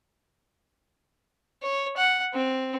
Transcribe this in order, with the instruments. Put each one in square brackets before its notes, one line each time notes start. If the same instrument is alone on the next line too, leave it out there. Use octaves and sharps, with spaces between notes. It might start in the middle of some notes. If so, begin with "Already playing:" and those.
[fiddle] C#5
F#5
C4